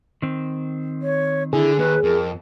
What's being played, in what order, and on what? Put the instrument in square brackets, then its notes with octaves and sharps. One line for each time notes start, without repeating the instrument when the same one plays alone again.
[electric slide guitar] D#3 C4
[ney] C#5
[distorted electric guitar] D3 [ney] E4 [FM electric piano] G#4
[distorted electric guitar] D#2 [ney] B4
[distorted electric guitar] F2 [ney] A#4